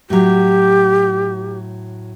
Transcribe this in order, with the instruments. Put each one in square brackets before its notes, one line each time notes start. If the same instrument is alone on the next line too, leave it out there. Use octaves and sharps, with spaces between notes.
[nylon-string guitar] A2 F#3 [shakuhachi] G4